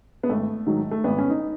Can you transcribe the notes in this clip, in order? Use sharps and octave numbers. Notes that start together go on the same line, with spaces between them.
B3
G#1 A3
G#2 D#3 F#3
A3
G#1 B3
C#4
D#4